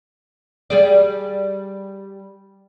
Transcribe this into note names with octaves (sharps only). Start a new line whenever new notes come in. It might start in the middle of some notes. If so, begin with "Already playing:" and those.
G3 G#4 D5